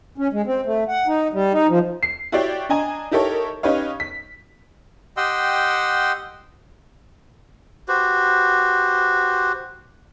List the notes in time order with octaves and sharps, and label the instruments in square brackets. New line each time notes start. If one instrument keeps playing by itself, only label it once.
[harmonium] C#4
G#3
C4
A3
F#5
D#4
G3
D#4
F3
[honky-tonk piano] C7
E4 F#4 G4 C#5 D5 G5
D4 D#5 G#5 A#5
D#4 E4 G4 A4 A#4 C#5
C#4 D#4 G4 B4 C#5 F5
B6
[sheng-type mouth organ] G4 D#5 F#5 G5 C6 E6
[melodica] F#4 G4 B4 C5